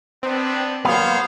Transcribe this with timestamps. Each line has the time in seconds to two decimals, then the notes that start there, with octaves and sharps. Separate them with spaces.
0.23 B3 C4 D4
0.85 F#3 A#3 B3 C5 C#5 F5